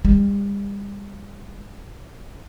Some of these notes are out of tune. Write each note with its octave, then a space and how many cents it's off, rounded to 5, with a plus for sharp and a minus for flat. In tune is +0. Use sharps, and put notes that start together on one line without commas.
G3 +40